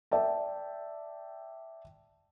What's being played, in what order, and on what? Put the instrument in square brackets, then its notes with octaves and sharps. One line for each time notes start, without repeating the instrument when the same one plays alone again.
[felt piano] D5 E5 G5 A5